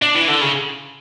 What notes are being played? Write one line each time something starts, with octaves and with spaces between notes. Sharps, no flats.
D4
E3
D3
C#3